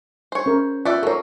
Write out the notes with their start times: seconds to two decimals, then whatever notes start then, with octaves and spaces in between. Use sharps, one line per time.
0.32 C5 C#5
0.46 C#4 A#4
0.85 B3 F4 D5 E5 G5
1.03 F#3 A#3 A4 A#4 C#5